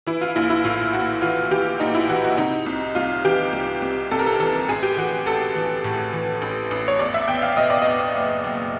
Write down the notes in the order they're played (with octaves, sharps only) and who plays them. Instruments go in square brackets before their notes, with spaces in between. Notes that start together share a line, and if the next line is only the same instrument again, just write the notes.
[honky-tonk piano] E3 E4
F4
A#1 E4
E4
A2 F4
A#1 F#4
E3 F4
E3 G4
A#1 D#4
E4
E3 F#4
F#4
C3 D#4
C2
C2 F4
E3 G4
C2
C2
C2 A4
A#4
A4
E3 A4
A1 G#4
G4
E3 F#4
A1 A4
E3
A2
E3
A1
A1
C#5
E2 D5
E5
E2 G5
F5
B2 D#5
D5
E2 D#5
F#1
F#1